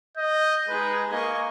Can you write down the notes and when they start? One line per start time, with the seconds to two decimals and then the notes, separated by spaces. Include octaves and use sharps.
0.17 D#5 G6
0.69 G#3 D#4 G#4 B4
1.12 A#3 D#5 G#5 C#6